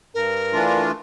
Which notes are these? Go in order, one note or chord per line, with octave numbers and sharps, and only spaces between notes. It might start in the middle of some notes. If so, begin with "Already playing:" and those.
G2 A#4
E3 A3 D4 F4